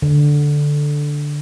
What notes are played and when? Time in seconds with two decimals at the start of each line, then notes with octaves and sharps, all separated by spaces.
0.02 D3